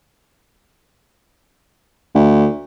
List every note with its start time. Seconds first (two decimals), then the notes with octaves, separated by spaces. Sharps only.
2.15 D2